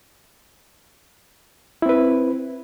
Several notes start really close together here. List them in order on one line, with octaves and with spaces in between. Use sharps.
E4 C4 B4